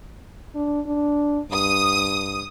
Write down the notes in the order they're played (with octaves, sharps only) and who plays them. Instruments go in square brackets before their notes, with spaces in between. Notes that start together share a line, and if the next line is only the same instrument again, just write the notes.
[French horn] D4
D4
[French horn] G2 [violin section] D#6